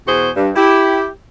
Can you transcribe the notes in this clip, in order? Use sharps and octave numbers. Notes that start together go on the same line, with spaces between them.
E2 B2 F#4 G#4 C5
G2
E4 G4